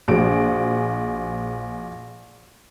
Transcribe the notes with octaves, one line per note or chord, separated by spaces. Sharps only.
A#1 F3 F#4 G#4 D7